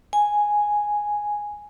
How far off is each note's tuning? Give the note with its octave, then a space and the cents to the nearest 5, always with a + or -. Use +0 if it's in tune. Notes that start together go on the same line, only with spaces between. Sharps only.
G#5 +0